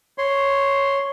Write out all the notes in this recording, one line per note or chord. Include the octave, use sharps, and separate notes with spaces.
C#5 C6